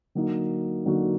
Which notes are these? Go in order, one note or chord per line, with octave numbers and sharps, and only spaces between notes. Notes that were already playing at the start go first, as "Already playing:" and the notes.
D3 F#3 A#3 D#4 F#4
D3 F#3 A#3 D#4 F#4